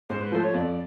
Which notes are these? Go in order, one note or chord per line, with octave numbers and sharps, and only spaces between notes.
G#2 C5
B4
F3 A3 C5
C#5
F2 D5